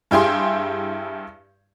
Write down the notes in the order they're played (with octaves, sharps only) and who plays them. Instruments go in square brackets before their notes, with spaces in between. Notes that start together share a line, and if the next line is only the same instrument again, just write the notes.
[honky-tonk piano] G2 E4 G4 G#4 C6